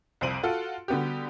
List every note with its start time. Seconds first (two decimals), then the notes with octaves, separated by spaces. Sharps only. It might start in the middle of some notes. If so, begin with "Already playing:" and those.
0.21 C2 F2 C5 D7 D#7 F#7
0.43 F4 F#4 A4 F#5
0.88 D3 G3 B3 F#4 G4